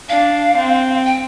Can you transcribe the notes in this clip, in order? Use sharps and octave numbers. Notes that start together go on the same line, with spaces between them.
D4 F5
C4
G5